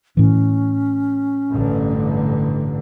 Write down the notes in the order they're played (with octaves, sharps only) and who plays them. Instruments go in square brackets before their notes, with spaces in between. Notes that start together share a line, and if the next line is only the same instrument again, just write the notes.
[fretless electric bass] A2 E3 [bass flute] C#4
[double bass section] A1 G2 D3